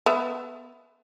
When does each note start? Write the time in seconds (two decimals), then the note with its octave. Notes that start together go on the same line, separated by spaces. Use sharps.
0.06 B3 E5